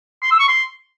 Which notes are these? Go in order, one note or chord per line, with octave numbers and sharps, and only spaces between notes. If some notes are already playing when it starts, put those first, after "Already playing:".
C6
E6
C#6
C6